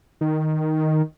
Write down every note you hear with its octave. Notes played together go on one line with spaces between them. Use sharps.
D#3